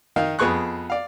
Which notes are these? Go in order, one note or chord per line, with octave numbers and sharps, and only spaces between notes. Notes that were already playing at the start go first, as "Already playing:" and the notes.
D#3 D#4 F5
F2 B3 G#4 C#6 F#6
D5 F5